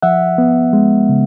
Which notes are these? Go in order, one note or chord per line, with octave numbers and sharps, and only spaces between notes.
F3 E5 F#5
B3
G#3
C#3